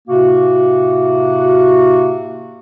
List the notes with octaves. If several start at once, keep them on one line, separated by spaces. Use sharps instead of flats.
A2 C3 A#3 F#4